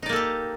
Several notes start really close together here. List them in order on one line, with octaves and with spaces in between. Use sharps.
D#4 D5 A#3 A4 G4